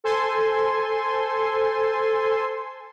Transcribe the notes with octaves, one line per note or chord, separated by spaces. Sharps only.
A4 C5 G#5 C6